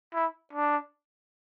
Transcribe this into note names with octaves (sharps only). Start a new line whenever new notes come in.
E4
D4